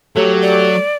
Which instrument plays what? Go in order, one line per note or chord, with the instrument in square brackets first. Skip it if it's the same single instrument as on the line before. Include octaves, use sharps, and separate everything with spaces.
[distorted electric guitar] F#3 [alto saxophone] A3 [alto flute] G4 [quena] C#5
[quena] D5